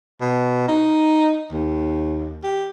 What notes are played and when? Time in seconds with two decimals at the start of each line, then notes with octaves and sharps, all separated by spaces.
0.21 B2
0.68 D#4
1.52 D#2
2.44 G4